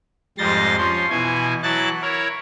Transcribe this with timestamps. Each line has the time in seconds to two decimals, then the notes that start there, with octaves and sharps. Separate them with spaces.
0.38 F2 G#2 G3 C6 A6 A#6
0.78 F3 C#4 C6
1.10 B2 E3 E4 G#5
1.63 E3 F#3 E4 A5 F#6 A6
2.02 E4 A#4 C#5